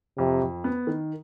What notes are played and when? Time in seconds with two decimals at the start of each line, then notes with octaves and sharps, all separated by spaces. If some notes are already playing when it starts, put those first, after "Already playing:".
0.18 F2 C3
0.42 F2
0.64 B3
0.87 D#3